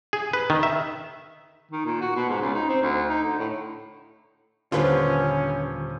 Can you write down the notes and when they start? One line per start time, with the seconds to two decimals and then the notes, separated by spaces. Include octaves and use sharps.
0.13 G#4
0.33 B4
0.50 D#3
0.63 E5
1.72 D#3
1.85 A#2
2.01 F#4
2.16 B2
2.29 G#2
2.41 C#2
2.54 D#4
2.69 C4
2.82 D2
3.09 D#4
3.24 D3
3.39 A2
4.72 D#1 D3 C#4 F4 B4 C5